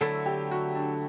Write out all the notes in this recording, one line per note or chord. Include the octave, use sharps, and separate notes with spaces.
D3 F#3 A3 E4 A4
G4
F#4
D4